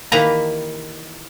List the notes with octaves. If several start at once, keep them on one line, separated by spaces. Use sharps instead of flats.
D#3 E3 A#3 G4 B4 A#5